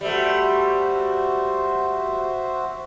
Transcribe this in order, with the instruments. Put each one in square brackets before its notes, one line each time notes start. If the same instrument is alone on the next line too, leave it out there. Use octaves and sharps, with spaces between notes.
[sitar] G3 A3 [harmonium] F#4 C5 E5